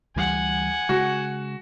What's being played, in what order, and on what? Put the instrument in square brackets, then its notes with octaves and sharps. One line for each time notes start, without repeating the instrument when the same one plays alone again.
[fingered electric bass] D2 E3 G3 [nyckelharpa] F#5 G#5
[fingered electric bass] C#3 G#3 [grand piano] F#4